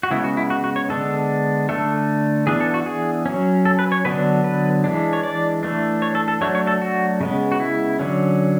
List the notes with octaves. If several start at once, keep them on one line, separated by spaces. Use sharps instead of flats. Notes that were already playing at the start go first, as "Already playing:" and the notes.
F#4
C#3 G#3 B3 E4
F#4
E4
F#4
F#4
C#5
D3 G#3 B3 D4 A4
D3 A3 D4 A4
E3 B3 D4 G#4
A4
F#4
G#4
F#3 C#4
A4
B4
C#5
D3 F#3 B3 D4 B4
B4
E3 G#3 D4
C#5
D5
E3 A3 D4
C#5
A4
A4
F#3 A3 D4 C#5
C#5
A4
F#4
C#3 G#3 B3
F#4
E4
D3 F#3 C#4